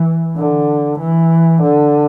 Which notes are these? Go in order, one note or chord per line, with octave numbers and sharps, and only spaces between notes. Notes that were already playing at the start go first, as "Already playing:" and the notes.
Already playing: E3
D3
E3
D3